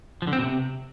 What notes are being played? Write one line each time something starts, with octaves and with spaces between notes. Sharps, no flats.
F3
D3
C4
B2
C3